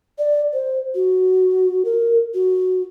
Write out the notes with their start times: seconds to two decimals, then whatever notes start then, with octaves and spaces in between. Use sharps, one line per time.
0.18 D5
0.53 C5
0.95 F#4
1.85 A#4
2.34 F#4